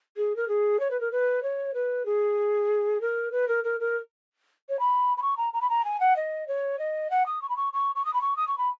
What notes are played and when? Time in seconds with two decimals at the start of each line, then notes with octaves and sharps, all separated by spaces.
0.17 G#4
0.36 A#4
0.48 G#4
0.80 C#5
0.91 B4
1.00 A#4
1.12 B4
1.43 C#5
1.74 B4
2.06 G#4
3.01 A#4
3.32 B4
3.48 A#4
3.64 A#4
3.80 A#4
4.69 C#5
4.79 B5
5.17 B5
5.22 C#6
5.37 A#5
5.53 A#5
5.61 B5
5.70 A#5
5.85 G#5
6.00 F#5
6.16 D#5
6.47 C#5
6.79 D#5
7.11 F#5
7.26 D#6
7.42 C#6
7.49 B5
7.56 C#6
7.73 C#6
7.95 C#6
8.05 D#6
8.14 B5
8.21 C#6
8.37 D#6
8.48 C#6
8.58 B5